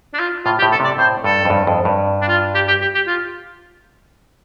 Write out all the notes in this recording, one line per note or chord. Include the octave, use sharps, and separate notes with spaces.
D4
F4
A2 F4
G4
A2
A4
C3 D5
A2 C5
G2 A4
F2
G2
F2
G2
D4
F4
G4
G4
G4
G4
F4